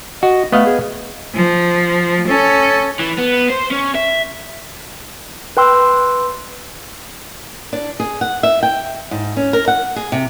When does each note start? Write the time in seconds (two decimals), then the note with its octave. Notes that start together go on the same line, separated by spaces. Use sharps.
0.23 F#4 D#5
0.52 A3 B3 D#5 F5
0.66 G#4
1.35 F3
2.27 C#4 A4
2.99 E3
3.18 B3
3.50 C5
3.71 C#4
3.95 E5
5.57 B4 G5 C6 E6
7.73 D4
8.00 G#4
8.21 F#5
8.43 E5
8.63 G5
9.11 G#2
9.37 C#4
9.53 A#4
9.68 F#5
9.96 G#4
10.12 C3